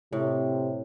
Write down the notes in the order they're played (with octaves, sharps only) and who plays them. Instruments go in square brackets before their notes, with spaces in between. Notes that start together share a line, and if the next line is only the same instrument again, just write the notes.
[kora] A2 [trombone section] C3